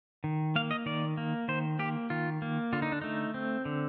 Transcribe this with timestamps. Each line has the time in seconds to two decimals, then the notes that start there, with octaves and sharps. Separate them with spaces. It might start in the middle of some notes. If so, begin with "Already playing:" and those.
0.24 D#3
0.56 A#3 F5
0.71 D#5
0.86 D#3 D5
1.18 A#3
1.48 D#3 C5
1.79 A#3 G4
2.10 D#3 F4
2.42 A#3
2.73 D3 F4
2.82 D#4
2.92 D4
3.02 A3 D#4
3.34 C4
3.65 D3